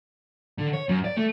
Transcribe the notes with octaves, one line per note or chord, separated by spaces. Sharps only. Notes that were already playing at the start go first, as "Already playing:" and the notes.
D3
C#5
F#2
D5
A3